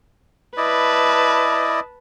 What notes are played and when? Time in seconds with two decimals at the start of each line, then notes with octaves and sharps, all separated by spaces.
0.57 E4 B4 D5 D#5 A5